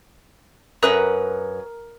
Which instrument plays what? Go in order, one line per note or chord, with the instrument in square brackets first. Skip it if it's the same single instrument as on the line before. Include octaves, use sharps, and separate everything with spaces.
[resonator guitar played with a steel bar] F#2 B4 C#5 [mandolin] A#4 D#6 F#6